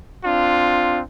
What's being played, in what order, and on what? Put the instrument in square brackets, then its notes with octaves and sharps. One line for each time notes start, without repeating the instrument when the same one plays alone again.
[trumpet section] C4 D4 F4